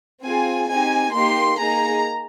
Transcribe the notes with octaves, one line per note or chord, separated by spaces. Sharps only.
C4 F4 G#4 G#5
C4 D#4 G4 G#5
A#3 D#4 G4 C6
A#3 D#4 G#4 A#5